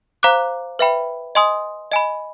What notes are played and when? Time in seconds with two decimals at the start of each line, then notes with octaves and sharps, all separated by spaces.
0.23 C5 F5 A#5 D6 F#6
0.79 B4 E5 G5 B5
1.35 D#5 G#5 C6 D#6
1.92 D#5 G#5 B5